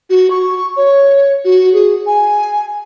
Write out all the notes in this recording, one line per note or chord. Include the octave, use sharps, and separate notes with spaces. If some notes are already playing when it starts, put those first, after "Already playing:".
F#4
C#6
C#5
F#4
G#4
G#5